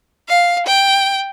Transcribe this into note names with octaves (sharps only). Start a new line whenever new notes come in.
F5
G5